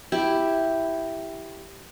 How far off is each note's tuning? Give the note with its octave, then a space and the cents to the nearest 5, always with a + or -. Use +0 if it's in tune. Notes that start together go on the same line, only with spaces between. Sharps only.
E4 +0 G4 +0